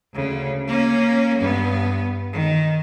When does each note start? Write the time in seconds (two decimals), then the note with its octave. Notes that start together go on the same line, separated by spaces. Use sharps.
0.14 D2 C#3
0.67 A#3 C#4
1.38 G2 B3
2.32 D#3